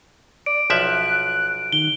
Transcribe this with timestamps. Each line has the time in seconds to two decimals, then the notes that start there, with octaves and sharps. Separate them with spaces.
0.46 D5 D7
0.70 B1 F3 E5 F#6
1.73 D#3 G7